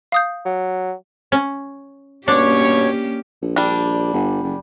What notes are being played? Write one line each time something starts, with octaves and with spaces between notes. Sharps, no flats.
F5 D#6 G6
F#3
C#4
G2 B2 A#3 C#4 D4 G4 C#5
A#1
G3 D4
G1
F#1